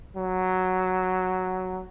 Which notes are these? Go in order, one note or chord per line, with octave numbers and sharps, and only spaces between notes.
F#3